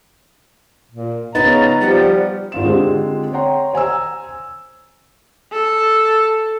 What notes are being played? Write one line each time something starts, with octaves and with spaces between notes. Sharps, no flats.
A#2
C#3 B3 D#4 A#5 A6
F3 G3 F#5
G#1 F4 E7
D3 G#3 C4 F4 G4
C#5 F#5 G5 A#5 C6
C5 G#5 A#5 E6
A4